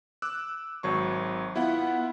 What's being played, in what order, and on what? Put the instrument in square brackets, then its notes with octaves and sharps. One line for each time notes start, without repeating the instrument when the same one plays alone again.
[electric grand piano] D6 E6 F#6
G#1 F#3 C#6
[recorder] B3 [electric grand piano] E4 F4 F#5